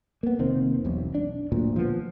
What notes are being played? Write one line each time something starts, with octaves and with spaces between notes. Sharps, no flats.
A#3 B3
F1 D#3 A#3 C4
E1 B1
D4
D1 D2 A#2
F3 B3